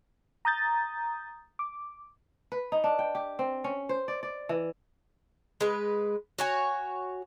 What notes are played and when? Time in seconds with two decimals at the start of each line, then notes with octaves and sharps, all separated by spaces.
0.45 A#5 D#6 G6 A6
1.59 D6
2.52 B4
2.72 D#4
2.84 D4
2.99 G5
3.15 G4
3.39 C4
3.64 C#4
3.89 C5
4.08 D5
4.23 D5
4.49 E3
5.61 G#3 B4
6.38 F#4 C#5 G#5